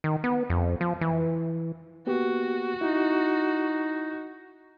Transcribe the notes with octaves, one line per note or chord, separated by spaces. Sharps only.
D#3
B3
F2
F3
E3
A#3 B3 F#4 G4
D#4 E4